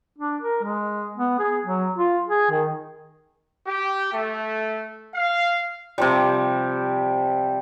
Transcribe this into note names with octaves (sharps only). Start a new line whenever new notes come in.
D4
A#4
G#3
B3
G#4
F#3
F4
G#4
D#3
G4
A3
F5
C3 F3 G3